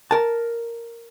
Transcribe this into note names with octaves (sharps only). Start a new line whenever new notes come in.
A#4 A5